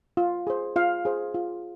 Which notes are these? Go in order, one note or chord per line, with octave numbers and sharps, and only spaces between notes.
F4
G#4 C5
F4 F5
G#4 C5
F4